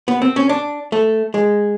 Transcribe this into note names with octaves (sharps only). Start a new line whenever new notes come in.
B3
C4
C#4
D4
A3
G#3